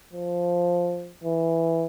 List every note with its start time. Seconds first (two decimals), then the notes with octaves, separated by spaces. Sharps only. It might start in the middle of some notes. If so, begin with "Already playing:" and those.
0.13 F3
1.24 E3